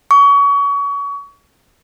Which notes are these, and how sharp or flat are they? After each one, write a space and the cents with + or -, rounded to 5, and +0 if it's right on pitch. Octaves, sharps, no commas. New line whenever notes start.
C#6 +30